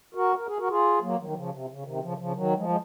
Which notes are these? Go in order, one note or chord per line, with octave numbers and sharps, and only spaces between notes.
F#4 A#4
A#4
G#4
F#4 A#4
F4 G#4
F#3 A#3
D#3 F#3
F#3
C#3 F3
C3
C#3
C3 D#3
C#3 F3
C#3 F3
D#3 F#3
F3 G#3
G#3